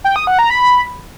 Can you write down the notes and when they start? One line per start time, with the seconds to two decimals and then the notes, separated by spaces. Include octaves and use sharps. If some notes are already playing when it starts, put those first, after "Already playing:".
0.04 G5
0.16 D#6
0.27 F#5
0.39 A#5
0.50 B5